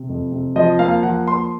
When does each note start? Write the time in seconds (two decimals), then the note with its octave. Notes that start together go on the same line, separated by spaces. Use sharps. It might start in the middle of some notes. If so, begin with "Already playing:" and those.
Already playing: C3
0.09 F2
0.32 C3
0.56 F3 D#5
0.79 A#3 F5
1.03 F3 F#5
1.27 A#3 C6